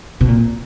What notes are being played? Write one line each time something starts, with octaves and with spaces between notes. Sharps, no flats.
B2
A#2